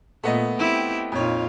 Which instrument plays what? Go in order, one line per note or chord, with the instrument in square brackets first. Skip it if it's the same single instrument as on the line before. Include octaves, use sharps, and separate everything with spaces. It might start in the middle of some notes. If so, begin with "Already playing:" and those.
[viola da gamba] A#2 [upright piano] A3 B3 D#5
[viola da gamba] C4 E4 G4
[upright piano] F2 C#5 [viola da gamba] A#2 D#4 F4